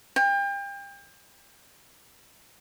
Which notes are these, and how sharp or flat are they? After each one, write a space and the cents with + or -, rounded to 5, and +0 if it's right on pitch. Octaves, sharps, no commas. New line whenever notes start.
G5 +35